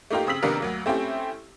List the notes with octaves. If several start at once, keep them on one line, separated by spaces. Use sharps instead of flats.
A3 A#3 D#4 F4 G4
C#3 C4 D#6 E6 B6 F#7
C3 D#3 A#3 B3 D4 A#4
D2 F#3 A#3
A3 C4 C#4 E4 G4